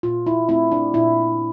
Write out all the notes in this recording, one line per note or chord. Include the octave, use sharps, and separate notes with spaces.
A#2 F4
E4
A3 C4 E4
D4
A#2 E4